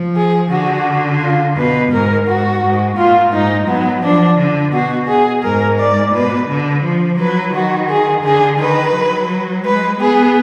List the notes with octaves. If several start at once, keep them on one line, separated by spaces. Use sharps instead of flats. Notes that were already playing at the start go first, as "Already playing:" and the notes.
Already playing: F3
G#4
D3 F#4
F4
B2 B4
G#2 A#4
G#2 F#4
G#2
A#2 F4
G#2 D#4
F#3 B3
F3 D4
D3
B2 F#4
G#4
G#2 A#4
D5
B2 B4
D3
F3
F#3 B4
D#3 F#4
G#4
D3 G#4
D#3 B4
F#3
G#3 B4
B3 G#4